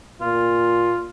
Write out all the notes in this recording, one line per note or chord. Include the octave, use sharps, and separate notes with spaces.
A#2 F4